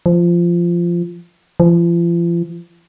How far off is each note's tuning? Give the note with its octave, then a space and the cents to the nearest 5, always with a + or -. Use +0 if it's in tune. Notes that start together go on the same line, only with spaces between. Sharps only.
F3 -15
F3 -40